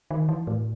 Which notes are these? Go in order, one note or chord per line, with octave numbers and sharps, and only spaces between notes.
D#3
E3
A2